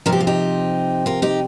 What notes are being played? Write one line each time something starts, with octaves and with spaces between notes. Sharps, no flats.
C3 F3 A#4
G4
F4
D#4 G4
F4 A#4
D#4 G4